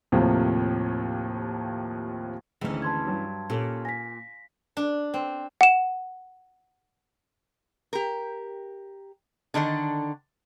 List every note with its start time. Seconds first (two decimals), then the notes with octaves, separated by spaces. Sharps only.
0.12 D#2 A2 C3 F3 A#3
2.61 G#1 D2 E3 C#4
2.82 A5 C6 G#6
3.06 G2 F#3
3.50 A#2 C#4 G4 A4
3.85 G#5 A#6 B6
4.77 D4
5.14 C4
5.61 F#5 E7
7.93 G4 A#4
9.54 D3 D#3 D4 A4